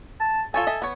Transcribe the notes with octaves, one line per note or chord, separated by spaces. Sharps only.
A5
F4 A4 C#5 G#5
D#5 E5 G#5
B3 C#5